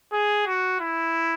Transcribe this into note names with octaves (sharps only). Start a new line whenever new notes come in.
G#4
F#4
E4